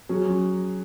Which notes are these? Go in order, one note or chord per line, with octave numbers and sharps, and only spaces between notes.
F#3 C#4 G#4